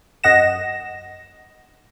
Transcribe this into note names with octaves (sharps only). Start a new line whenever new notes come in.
F#2 D#5 F#5 A#6 E7